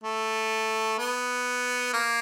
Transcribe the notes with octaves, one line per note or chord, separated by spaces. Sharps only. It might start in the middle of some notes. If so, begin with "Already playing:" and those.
A3
B3
A#3